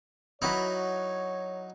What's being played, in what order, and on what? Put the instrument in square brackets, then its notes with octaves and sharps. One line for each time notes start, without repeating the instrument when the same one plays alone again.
[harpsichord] F#3 D#4 [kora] E4 F#4 B4 [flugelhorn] C#5